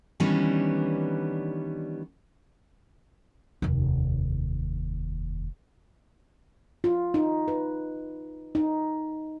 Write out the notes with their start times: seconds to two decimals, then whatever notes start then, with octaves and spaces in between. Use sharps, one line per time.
0.20 D#3 E3 G3 B3 C#4 D4
3.62 F1 D#2
6.84 F4
7.14 D#4
7.48 B4
8.55 D#4